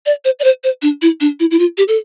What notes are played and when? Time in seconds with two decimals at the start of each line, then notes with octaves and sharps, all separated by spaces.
0.06 D5
0.25 C5
0.39 D5
0.44 C5
0.64 C5
0.82 D4
1.02 E4
1.21 D4
1.40 E4
1.51 E4
1.59 F4
1.78 G4
1.88 A4